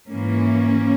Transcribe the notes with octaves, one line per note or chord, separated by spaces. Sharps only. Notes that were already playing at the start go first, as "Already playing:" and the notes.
G#2 E3 A#3 C#4